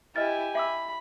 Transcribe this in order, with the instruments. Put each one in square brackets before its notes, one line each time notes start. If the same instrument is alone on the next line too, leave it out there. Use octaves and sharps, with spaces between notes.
[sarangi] E4 [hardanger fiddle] G4 G#5 [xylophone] D#5 F6 A6
[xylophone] E5 D6 E6 [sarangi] B5